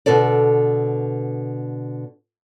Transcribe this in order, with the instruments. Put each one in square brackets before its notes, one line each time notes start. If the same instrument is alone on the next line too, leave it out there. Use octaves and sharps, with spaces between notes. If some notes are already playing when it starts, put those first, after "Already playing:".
[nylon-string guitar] B2 D3 A4 D5